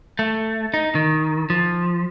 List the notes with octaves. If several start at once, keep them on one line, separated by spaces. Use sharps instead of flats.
A3
D#4
D#3
F3